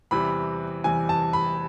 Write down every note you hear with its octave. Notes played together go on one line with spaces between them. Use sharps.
E2 C3 E3 G3 B5
E2 C3 E3 G3 G#5
A5
B5